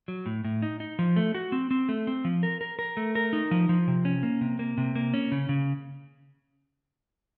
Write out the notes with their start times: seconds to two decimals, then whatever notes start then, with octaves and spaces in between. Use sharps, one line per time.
0.08 F#3
0.26 A2
0.44 A2
0.62 D#4
0.80 D#4
0.99 F3
1.16 A3
1.34 F#4
1.52 C4
1.71 C4
1.89 A3
2.07 C4
2.25 F3
2.43 A#4
2.61 A#4
2.79 A#4
2.97 A3
3.15 A#4
3.33 D#4
3.51 F3
3.69 F3
3.88 C3
4.05 C#4
4.23 A#3
4.41 C3
4.59 A#3
4.78 C3
4.96 A#3
5.14 C#4
5.32 C#3
5.49 C#3